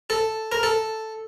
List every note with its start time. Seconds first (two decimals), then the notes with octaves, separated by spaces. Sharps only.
0.10 A4
0.52 A#4
0.63 A4